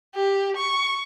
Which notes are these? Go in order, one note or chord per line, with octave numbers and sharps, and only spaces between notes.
G4
C#6